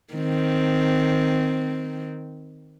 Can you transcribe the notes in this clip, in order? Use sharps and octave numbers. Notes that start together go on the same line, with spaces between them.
D#3 C4